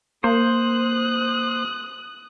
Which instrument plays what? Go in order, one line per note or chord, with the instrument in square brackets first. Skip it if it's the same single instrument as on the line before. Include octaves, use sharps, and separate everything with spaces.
[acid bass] A#3 [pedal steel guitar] C5 [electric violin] D#6 F#6